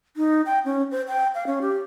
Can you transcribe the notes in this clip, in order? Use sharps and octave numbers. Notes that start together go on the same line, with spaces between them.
D#4
G5
C#4
C5
G5
F5
C#4
G4